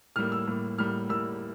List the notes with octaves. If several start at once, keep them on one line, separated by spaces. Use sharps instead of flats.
A2 G3 A#3 F6
E6
A2 G3 A#3
A2 G3 A#3 F6
A2 G3 A#3 E6